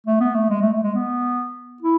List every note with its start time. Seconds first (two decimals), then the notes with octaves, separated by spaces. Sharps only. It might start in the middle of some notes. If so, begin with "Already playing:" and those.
0.06 A3
0.20 B3
0.34 A3
0.50 G#3
0.62 A3
0.73 A3
0.83 G#3
0.94 B3
1.82 E4